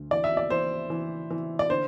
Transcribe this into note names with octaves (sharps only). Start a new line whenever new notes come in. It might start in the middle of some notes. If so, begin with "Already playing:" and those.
Already playing: D2
E3 D5
E5
D5
E3 C5
E3
E3
D5
D3 C5